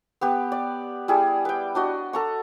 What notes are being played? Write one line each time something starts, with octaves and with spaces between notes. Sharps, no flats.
B3 G4 B4
D5
G3 E4 G#4
B4 G5
D4 F#4 D#5
A4 A#5 C#6